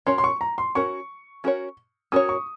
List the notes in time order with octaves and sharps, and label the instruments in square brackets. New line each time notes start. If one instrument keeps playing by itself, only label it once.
[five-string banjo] C#4 F#4 A#4 C#5 [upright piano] C6
[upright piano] C6
C#6
A#5
C6
[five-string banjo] C#4 F#4 A#4 C#5 [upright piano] C#6
[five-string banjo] C#4 F#4 A#4 C#5
[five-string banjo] C#4 F#4 A#4 C#5 [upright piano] D#6
[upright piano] C#6